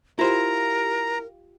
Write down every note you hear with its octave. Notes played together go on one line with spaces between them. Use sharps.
E4 F4 G4 A#4 C5 A#5